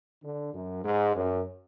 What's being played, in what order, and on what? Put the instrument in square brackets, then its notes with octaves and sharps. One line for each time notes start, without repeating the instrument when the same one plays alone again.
[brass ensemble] D3
F#2
G#2
F#2